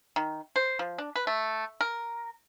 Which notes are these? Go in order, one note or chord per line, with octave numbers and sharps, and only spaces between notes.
D#3
C5
F3
D4
B4
A3
A#4